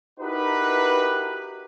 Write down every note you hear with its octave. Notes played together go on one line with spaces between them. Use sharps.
D#4 E4 F#4 G4 A#4 B4